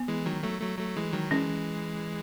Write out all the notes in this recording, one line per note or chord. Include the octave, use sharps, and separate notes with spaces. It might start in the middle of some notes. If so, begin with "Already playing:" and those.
Already playing: B3
E3 G#3
D#3 F#3
F#3 A3
F#3 A3
F#3 A3
E3 G#3
D#3 F#3
E3 G#3 C#4